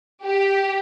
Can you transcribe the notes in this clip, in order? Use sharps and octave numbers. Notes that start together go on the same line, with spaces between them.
G4